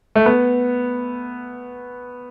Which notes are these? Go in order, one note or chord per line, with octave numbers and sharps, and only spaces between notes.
A3
B3